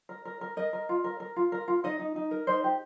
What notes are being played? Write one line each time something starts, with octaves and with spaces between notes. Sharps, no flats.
A#4
A#4
A#4
A#4 D#5
A#4
F4
A#4
A#4
F4
A#4
F4
D#4 D#5
D#4
D#4
A#4
D#4 C5
G4